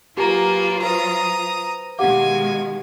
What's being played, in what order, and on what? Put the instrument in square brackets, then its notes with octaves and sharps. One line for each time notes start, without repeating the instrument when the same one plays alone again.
[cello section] F#3 F4 [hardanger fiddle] A#3 B4 [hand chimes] G4 G#5 A#5
[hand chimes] B4 C5 [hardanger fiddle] A#5 D#6
[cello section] B2 D#3 G#3 [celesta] G4 F#5 D6 [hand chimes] F5 [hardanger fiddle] G#5